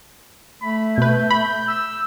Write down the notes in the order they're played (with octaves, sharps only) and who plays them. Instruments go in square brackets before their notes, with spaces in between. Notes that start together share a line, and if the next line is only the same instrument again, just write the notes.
[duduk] A3 [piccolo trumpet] B5
[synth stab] B2 B4 [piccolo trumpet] G6
[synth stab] B5
[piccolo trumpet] E6